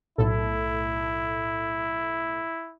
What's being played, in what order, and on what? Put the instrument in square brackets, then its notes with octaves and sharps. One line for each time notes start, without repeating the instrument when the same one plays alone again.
[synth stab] B1 A2 A4 [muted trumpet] E4